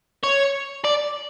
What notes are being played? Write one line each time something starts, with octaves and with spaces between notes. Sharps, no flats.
C#5
D5